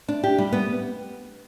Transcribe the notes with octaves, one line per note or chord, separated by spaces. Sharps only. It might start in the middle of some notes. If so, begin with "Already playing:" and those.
D4
G4
G3
B3